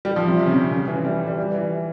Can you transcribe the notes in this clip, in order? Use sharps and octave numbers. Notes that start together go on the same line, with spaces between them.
G3
F3
C3
C3
C#3
C3
C#3
E3
G3
G3
E3
E3